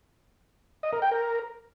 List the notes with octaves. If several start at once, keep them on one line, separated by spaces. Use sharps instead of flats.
D#5
A#4
G5
A#4